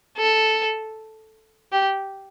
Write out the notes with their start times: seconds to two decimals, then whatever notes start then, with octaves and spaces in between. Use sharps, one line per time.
0.18 A4
1.72 G4